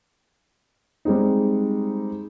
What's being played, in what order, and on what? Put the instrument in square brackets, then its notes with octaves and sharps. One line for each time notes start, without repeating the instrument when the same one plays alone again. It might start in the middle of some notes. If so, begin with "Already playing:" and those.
[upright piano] G3 G#3 C4 D#4